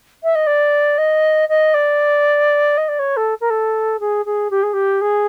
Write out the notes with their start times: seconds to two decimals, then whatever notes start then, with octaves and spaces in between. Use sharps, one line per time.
0.23 E5
0.35 D#5
0.46 D5
0.98 D#5
1.49 D#5
1.74 D5
2.77 D#5
2.88 D5
2.99 C#5
3.16 A4
3.40 A#4
3.50 A4
4.00 G#4
4.25 G#4
4.50 G4
4.63 G#4
4.73 G4
5.01 G#4